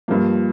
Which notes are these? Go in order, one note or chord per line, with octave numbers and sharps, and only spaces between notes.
G2 F3 A#3